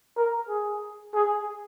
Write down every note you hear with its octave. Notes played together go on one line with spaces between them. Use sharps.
A#4
G#4
G#4